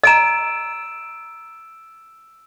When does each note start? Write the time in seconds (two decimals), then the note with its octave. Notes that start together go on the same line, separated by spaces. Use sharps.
0.03 D#5 A#5 E6 D7 E7